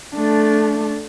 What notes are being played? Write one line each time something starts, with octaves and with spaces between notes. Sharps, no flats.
A3 D4